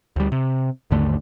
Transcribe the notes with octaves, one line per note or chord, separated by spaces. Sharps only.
D2 G3
C3
G#1 D#2 D3 A3